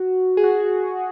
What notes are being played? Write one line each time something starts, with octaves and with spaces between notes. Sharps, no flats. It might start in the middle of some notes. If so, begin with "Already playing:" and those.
Already playing: F#4
G#4
F#4
G#4